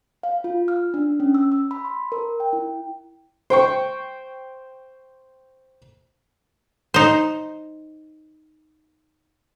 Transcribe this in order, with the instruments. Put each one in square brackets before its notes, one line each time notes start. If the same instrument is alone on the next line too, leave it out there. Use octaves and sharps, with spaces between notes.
[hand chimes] F5
F4
F6
D4
C#4
E6
E6
B5
C6
A#4
G5
E4
[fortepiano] C5 G5 C#6
[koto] D#4 C5